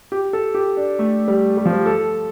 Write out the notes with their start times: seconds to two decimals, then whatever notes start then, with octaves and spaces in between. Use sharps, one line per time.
0.12 G4
0.33 A4
0.54 G4
0.77 D4
0.99 A3
1.28 G3
1.57 G3
1.66 F3
1.73 G3
1.86 A4